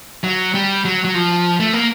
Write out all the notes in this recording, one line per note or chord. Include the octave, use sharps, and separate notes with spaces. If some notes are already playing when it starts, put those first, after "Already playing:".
F#3
G3
F#3
F#3
F3
A3
A#3